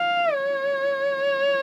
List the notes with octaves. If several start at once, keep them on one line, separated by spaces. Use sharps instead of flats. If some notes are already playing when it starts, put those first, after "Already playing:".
Already playing: F5
C#5